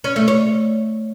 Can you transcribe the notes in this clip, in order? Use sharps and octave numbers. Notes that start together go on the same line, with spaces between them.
C#4
A3
C#5